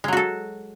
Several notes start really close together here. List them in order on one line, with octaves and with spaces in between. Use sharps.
G#3 F#3 F#4 A4